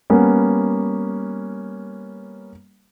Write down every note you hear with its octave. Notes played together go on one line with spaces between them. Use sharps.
G3 A#3 B3 C#4